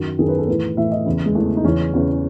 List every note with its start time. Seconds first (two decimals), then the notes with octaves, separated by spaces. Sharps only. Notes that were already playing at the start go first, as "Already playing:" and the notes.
Already playing: F#2 D#3 F#4
0.19 F#2 D#3 G#4
0.29 B4
0.38 A4
0.48 A2 E3 B4
0.77 A2 E3 E5
0.92 D#5
1.06 E2 C#3 E3 E4
1.26 G#3
1.35 E2 C#3 E3 A3
1.57 D#4
1.64 E2 C#3 E3 C#4
1.94 E2 C#3 E3